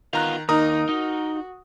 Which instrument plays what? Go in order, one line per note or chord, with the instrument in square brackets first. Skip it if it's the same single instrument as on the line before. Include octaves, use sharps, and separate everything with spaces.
[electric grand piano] D#3 A#5 F#6 [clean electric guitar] B3 F4 F5
[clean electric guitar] D#2 [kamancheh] D#4 [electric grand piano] A#4 A#5 D#6
[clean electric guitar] D#4 [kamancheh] F#4